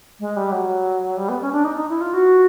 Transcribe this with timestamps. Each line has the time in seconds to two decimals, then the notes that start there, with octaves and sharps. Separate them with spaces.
0.20 G#3
0.36 G3
0.52 F#3
1.17 G3
1.29 B3
1.41 C#4
1.53 D4
1.65 D#4
1.77 D#4
1.89 E4
2.01 F4
2.14 F#4